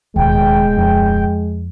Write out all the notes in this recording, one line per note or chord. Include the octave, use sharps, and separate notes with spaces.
D1 D#2 B2 G#3 G5
F2